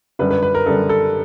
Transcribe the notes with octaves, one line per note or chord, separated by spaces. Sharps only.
F#2 D3 G3 B4
B4
B4
A#4
F#2 D3 G3 A4
A4